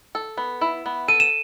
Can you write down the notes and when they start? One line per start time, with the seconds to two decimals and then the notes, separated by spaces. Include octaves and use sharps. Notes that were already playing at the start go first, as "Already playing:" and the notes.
0.15 A4
0.37 B3
0.61 E4
0.86 B3
1.08 A4 D#7
1.20 E7